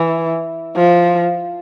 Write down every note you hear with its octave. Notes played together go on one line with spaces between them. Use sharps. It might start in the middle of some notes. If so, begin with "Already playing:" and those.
Already playing: E3
F3